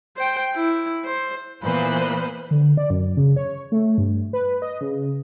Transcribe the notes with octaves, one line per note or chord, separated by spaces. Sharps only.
C5 G5
E4
C5
A#2 E3 A#3 B3 B4 C5
D3
D5
F#2
C#3
C#5
A3
G2
B4
D#5
C#3